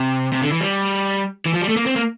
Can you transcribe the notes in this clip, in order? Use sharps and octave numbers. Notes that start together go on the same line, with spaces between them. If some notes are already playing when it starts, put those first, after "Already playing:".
Already playing: C3
C3
D3
E3
G3
E3
F3
G3
A3
A#3
C4
A#3